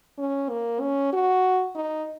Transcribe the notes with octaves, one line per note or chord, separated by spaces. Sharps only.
C#4
A#3
C#4
F#4
D#4